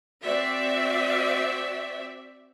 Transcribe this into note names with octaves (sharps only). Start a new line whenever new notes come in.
C4 F#4 D5 E5